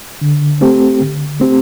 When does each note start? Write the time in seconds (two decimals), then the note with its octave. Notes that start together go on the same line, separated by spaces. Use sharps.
0.21 D3
0.61 A3 C4 G4
1.01 D3
1.40 A3 C4 G4